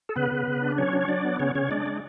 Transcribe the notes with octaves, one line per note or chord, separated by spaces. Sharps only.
A4
C#3 B3 B4
C#3
C#3
D4
F#3 C#4 C#5
D4
C#5
F#3 D4 D5
B3
C#3 C#4 C#5
C#3 C#4 C#5
G#3 D4 D5
G#3